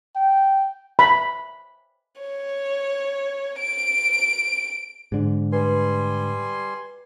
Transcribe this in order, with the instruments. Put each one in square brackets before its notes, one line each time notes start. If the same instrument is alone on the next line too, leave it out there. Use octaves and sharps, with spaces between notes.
[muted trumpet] G5
[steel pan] B5
[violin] C#5
D7
[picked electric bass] G#2 D3
[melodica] G3 G#5 C6 [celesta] B4